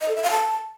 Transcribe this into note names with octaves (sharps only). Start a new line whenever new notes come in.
D#5
A4
E5
F5
A5